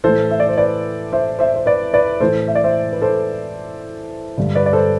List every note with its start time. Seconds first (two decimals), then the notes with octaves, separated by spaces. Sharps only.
0.04 A2 E3 A4 C5
0.31 E5
0.40 D5
0.49 C5
0.57 B4 D5
1.13 C5 E5
1.39 C5 E5
1.56 C5
1.66 B4 D5
1.94 B4 D5
2.20 A2 E3 A4 C5
2.48 E5
2.55 D5
2.64 C5 E5
2.93 B4
3.02 A4 C5
4.38 G2 D3
4.55 B4 D5
4.66 D5
4.73 A4 C5